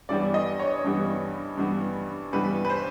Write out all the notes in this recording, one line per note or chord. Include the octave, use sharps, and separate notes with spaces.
G2 E3 G3 B3 D5
D#5
C#5
G2 E3 G3 B3
G2 E3 G3 B3
G2 E3 G3 B3 B4
B4
C5